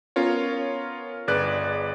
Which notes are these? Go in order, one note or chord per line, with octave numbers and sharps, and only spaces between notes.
B3 C#4 F4 A#4 C#5
G1 G#4 B4 D5 F#6